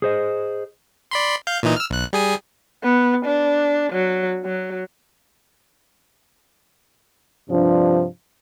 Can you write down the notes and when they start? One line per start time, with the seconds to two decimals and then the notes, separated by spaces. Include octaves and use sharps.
0.02 G#4 C5 D#5
1.11 D5 B5 C6
1.47 F5 G6
1.63 A#2 E3 D#4
1.76 E6 F6
1.90 B1 F#6
2.13 G3 G#4 G#5
2.83 B3
3.25 D4
3.93 F#3
4.45 F#3
7.49 G2 C3 F3 D4